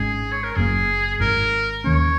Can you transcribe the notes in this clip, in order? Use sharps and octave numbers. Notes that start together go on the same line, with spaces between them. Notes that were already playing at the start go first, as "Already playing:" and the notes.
Already playing: G#1 G#2 G#3 C#4 G#4
C#5
A#4
F#1 F#2 F#3 A#3 G#4
G#1 G#2 G#3 A#4
D#2 D#3 A#3 C#4 C#5